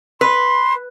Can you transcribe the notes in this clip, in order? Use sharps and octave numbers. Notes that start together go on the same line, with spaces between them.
B4 C6